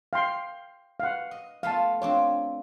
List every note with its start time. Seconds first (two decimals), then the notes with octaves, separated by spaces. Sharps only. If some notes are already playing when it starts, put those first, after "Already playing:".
0.13 F5 G5 C6
1.00 F5 F#5
1.31 D#5
1.63 A3 B3 F4 F5 A5
2.02 C4 D4 F4 C#5